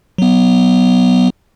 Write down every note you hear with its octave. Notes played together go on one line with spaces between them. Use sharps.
F#3 B3